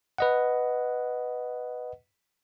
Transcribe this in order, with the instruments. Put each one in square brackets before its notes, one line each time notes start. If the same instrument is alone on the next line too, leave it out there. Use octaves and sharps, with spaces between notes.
[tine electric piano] B4 D#5 F#5